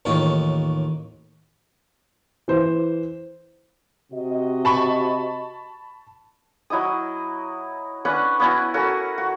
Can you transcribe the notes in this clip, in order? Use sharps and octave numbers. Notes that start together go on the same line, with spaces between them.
A1 D#2 D#3 F4 C#5
E3 C5
C3 F#4 D#5
A5 B5 C#6
F#3 E4 D#5 D#6
C#4 D4 B4 F#5
B3 C#4 E4 F#4
C#4 F#4 A4 A#4
F#4